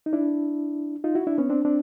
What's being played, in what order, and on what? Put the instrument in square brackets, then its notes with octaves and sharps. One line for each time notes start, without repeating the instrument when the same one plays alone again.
[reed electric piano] D#4
D4 E4
D#4 F4
E4 F#4
D4 E4
B3 C#4
C4 D4
C4 D4